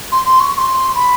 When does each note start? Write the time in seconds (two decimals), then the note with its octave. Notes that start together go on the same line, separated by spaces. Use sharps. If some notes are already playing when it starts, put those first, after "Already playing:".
0.11 C6
0.25 C6
0.39 C#6
0.53 C#6
0.57 C6
0.94 B5